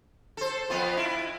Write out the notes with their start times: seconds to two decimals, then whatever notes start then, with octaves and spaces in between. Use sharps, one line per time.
0.37 A4 C5
0.70 F2 B3 F4
0.97 E4